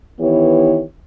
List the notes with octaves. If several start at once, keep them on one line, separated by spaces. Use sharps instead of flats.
D#3 E3 B3 E4 G4 C#5